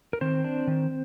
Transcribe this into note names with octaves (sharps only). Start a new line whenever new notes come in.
A#4
D#3 C4 C5
D4
D#3